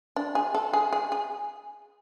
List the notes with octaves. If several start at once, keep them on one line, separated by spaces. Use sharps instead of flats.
D4
G#4
A4
G#4
G#4
G#4